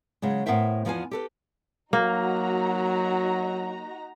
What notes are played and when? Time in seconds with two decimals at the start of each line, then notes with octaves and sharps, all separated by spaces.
0.22 C#3 F#3 G#3
0.46 A2 B3 A#4 C5 E5 G5
0.85 E2 F3 B3 F4 F5 G#5
1.11 G4 A4 B4
1.93 F#3 A#3 D#4 F#4 A#5